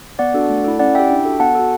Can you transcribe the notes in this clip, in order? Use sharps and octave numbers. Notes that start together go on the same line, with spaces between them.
B3 D5 F#5
D4 F#4 A4
A3
E4 A4
C#4 D5 F#5
E4 G4 E5 G5
D4
F#4 A4
B3 F#5 A5
F#4 A4